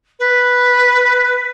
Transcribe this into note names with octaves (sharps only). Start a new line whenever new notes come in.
B4